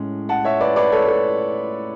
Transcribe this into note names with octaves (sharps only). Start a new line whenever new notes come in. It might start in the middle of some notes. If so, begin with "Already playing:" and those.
Already playing: A2 G#3 C#4
F#5 A5
C#5 E5
B4 D5
B4 D5
A4 C#5
A4